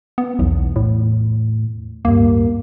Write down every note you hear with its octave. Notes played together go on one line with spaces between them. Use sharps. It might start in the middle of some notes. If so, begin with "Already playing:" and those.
B3
B1 E2
A2
D1 G2 A#3